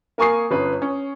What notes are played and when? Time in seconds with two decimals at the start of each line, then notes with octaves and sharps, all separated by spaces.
0.18 A#3 A#4 G#5 C#6 D#6 C7
0.51 G1 C#4 B4
0.82 C#4